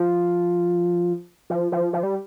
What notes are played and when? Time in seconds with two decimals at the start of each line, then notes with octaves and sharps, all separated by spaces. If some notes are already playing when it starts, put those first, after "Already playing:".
Already playing: F3
1.50 F3
1.72 F3
1.93 F3
2.03 G3